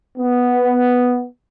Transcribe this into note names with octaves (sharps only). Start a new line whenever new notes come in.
B3